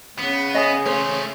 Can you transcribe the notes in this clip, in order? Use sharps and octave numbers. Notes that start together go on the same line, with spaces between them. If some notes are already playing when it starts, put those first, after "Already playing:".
C#3 B3
C#5 D#5 G#5 D#6
A3 C#4 C5